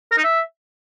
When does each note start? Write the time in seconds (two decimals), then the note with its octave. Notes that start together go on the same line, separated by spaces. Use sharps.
0.12 A#4
0.18 D#4
0.24 E5